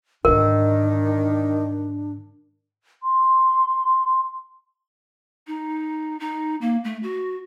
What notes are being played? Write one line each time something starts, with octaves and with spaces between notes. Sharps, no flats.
G#2 D3 D#3 D4 A#4
C6
D#4
D#4
A#3
A3
F#4